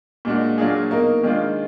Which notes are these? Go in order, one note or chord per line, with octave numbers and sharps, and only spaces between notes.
A#2 G#3 D4 F#4
A#2 F#3 D4 F4 G#4
B2 A#3 D#4
D#3 G#3 D4 F4